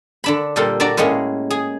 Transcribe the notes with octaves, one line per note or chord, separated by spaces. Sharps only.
D3 D4 B5
A#2 G3 A4 A#4 C6
D4 F#4 D5 A#5
A2 G#3 A#3 C#4 G#4
G#4